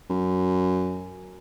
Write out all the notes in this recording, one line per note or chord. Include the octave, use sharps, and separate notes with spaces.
F#2